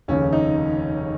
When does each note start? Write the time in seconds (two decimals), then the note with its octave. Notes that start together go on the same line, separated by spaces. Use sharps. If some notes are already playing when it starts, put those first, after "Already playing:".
0.08 F1 D#2 C#3 C#4
0.32 D#4